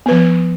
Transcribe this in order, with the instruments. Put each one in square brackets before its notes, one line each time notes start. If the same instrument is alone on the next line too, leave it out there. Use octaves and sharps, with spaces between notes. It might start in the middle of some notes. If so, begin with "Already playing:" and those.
[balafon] B3
B4
F3